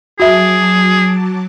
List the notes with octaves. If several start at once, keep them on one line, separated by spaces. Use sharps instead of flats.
F#3 F#4 G#4 E5 A5 D6